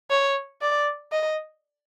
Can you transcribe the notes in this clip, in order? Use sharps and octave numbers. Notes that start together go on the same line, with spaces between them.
C#5
D5
D#5